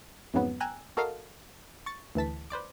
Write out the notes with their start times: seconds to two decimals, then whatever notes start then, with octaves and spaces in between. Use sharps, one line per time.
0.34 F2 G#2 C#3 F#3 B3
0.60 G5 G#5 A#5 E6 F#6
0.97 F#4 A4 A#4 D#5 F5 A#5
1.86 C#6 A6
2.15 D2 E3 A5 B6
2.50 B4 C5 D5 D6